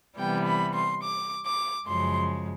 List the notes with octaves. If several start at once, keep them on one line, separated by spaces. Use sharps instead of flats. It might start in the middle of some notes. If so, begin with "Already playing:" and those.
C3 E3 G3 B3 G5
B5
C6
D6
D6
F#2 C#3 F3 G#3 C6